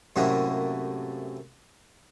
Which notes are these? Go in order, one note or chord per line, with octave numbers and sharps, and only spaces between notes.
F#2 A2 C3 F#3 A#3 E4